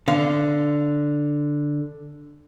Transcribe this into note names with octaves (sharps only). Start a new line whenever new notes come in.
D3 F5